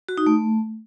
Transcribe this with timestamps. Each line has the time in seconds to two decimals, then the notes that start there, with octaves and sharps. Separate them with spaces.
0.09 F#4
0.18 D#4
0.26 A3